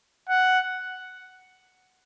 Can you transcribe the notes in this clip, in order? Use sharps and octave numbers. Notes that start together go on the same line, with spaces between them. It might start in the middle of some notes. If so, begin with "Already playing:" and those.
F#5